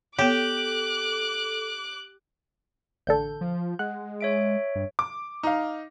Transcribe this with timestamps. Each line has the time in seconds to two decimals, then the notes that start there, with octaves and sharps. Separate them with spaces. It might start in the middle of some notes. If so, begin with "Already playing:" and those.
0.18 B3 G4 A4 C#5 D6 F#6
3.07 A1 D3 A4 G6
3.41 F3
3.79 G#3 F#5
4.21 C#5 E5 D7
4.75 G2
4.99 D6
5.43 D#4 F5